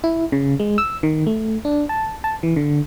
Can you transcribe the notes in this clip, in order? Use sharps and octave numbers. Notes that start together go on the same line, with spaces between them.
E4
C#3
G#3
E6
D#3
A3
D4
A5
A5
E3
D3